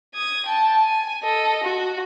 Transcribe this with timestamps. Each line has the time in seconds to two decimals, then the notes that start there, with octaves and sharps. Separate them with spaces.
0.15 D#6 G#6
0.46 G5 A5
0.83 G#5
1.23 A4 D#5
1.64 F#4